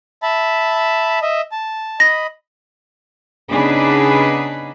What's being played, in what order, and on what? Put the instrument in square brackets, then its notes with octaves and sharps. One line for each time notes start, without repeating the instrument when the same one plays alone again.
[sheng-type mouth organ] E5 A5 B5
D#5 E5
A5
[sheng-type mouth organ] D#5 B5 [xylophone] A#6
[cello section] C#3 B3 D4 D#4 G#4 B4